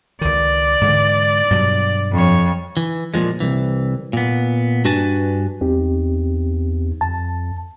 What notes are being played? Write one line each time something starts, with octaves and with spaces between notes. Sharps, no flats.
C#2 D#3 D5
G#2 D3 E3
G2 B2 F#3
F2 C#5
E3
A#2 C#3 F3 G#3
C2 E3
A#2 B3
G2 D4 F#4 B4 G#5 A5
E2 C4 D#4 G4
F2 A5